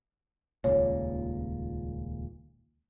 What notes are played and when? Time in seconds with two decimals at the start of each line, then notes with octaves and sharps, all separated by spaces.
0.64 D#1 C#2 A#2 C#5